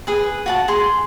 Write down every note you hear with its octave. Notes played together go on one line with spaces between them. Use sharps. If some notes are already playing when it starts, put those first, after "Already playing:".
G#4 B4
F#4 F#5 A5
G#4 C6